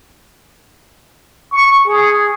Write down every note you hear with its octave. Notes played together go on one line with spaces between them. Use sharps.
C#6
G#4